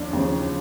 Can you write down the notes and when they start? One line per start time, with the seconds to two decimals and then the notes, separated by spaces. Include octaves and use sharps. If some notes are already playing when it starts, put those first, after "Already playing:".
Already playing: D#2 F3 D4
0.13 D#2 C#3 F3